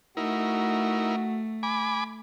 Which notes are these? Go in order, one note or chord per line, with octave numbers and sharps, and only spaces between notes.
A3 D#4 E4 F#4 A#4
G#5 B5 D6